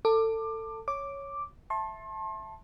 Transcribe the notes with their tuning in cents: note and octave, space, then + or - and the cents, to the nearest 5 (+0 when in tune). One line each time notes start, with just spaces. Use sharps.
A4 +25 D6 +20
C#5 +0 D6 +0
E5 +0 A5 +0 C6 +40